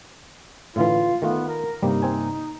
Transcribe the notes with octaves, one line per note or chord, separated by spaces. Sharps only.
A2 D3 E3 F4
D#3 A3 B3 F4
A#4
G2 C3 G3 A#3 D#4
C4 G#5